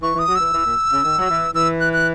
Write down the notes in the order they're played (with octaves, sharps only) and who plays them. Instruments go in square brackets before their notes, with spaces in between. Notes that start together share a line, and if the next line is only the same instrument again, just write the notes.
[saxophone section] E3 [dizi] C#6
[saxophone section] E3
[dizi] D#6
[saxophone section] F#3
[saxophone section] E3 [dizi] E6
[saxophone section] E3
A#2
C#3
D#3
F#3
E3
[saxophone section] E3 [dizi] E6
[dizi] F#6
F#6